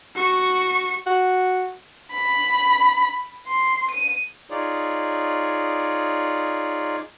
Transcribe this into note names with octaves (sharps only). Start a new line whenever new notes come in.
F#4 C#6
F#4
B5
C6
D#7
D#4 F4 G#4 C#5 D5